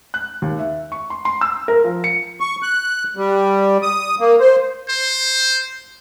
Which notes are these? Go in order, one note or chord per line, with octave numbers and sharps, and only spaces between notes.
F#6
D#2
E5
C#6
C6
C6
E6
A#4
F3
C#7
C#6
F#6
G3
D#6
A#3
C5
C5